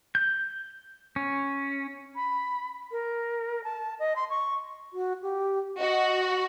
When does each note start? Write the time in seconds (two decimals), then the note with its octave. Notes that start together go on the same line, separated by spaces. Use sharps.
0.15 G6
1.16 C#4
2.15 B5
2.92 A#4
3.64 A5
3.99 D#5
4.16 C6
4.30 C#6
4.93 F#4
5.22 G4
5.78 F#4 D#5